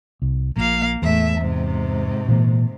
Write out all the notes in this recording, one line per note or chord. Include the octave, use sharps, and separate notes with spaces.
C2
A#1 A#2 A#3 F5
E2 A2 E5
G#2 C3
A#2 E3 A#3